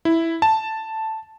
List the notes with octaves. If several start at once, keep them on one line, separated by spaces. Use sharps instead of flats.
E4
A5